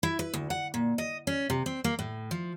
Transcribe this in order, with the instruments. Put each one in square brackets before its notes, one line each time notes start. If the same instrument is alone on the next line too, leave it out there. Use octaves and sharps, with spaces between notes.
[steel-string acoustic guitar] E4
B4
D2
F#5
A#2
D#5
C#4
C3
C4
A#3
A2
F3